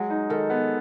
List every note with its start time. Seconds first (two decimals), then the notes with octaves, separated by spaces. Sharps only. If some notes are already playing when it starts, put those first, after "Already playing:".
Already playing: F#3 G#3
0.10 D#4
0.30 D#3 A4
0.50 B3